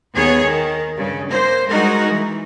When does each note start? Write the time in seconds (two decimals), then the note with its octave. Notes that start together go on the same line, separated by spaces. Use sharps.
0.15 D#2 B3 G#4 C#5
0.44 D#3
0.97 G2 C#3
1.29 A#3 C5
1.68 G3 G#3 D#4 F#4 A#4
2.09 E3